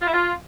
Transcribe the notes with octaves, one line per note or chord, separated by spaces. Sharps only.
F4
E4
F4